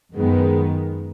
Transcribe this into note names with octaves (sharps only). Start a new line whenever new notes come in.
F#2 D#3 G#3 B3